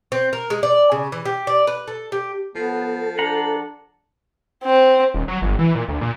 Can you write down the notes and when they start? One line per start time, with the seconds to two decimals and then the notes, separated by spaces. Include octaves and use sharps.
0.12 C4
0.33 A#4
0.50 G#3
0.63 D5
0.92 C#3
1.12 E3
1.25 G4
1.47 D5
1.67 B4
1.88 A4
2.12 G4
2.55 F3 B3 A4
3.19 D4 F#5 A#5
4.64 C4
5.14 D#1
5.28 F#3
5.42 G1
5.59 E3
5.75 A#2
5.88 D2
6.01 A#2